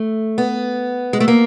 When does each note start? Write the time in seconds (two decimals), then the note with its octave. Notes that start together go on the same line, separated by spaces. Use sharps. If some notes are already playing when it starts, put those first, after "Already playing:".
Already playing: A3
0.38 B3
1.13 G#3
1.20 A3
1.28 A#3